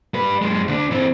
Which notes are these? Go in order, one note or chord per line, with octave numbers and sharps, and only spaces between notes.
G3 B4
F#2 G#3
D2 D4
E3 C4